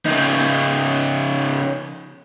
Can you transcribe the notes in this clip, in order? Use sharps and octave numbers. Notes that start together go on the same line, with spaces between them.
C#3 D#4